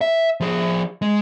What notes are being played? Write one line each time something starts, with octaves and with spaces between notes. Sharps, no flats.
E5
F3 G#4
G#3